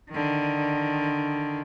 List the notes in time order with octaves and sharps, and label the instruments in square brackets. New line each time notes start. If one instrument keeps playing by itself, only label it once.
[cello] D3 D#3